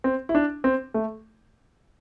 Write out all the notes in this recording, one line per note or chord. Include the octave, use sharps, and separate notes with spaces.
C4
E4
D4
C4
A3